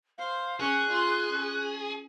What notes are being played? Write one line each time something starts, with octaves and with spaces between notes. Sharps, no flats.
C5 F5
C#4 G#4 C#5 F#6
F4 C6
C#4